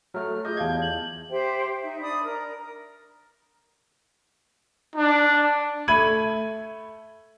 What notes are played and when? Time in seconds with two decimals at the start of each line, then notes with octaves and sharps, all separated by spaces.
0.14 F#3 A3 F6
0.45 F4 G#4 D#5 D6 G6
0.57 E2 G4 F5 A5 G#6
0.82 F#7
1.30 G4 C5 E5 G5
1.83 D#4 E5
2.00 D4 D5 B5 D#6
2.24 A#4 A#5
4.95 D4
5.88 A3 B5 G#6 D#7 F#7